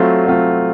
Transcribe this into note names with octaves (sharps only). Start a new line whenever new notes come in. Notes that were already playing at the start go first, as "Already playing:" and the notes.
Already playing: F#3 A3 C4 F4
F#3 A3 C4 F4